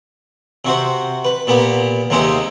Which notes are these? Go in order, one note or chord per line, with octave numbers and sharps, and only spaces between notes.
C3 F#4 C5
B4
A#2 B3 G4
D#2 C3 G#3 G4 C5